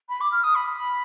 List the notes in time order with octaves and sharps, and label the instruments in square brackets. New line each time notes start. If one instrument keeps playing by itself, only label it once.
[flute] B5
D6
F6
D#6
B5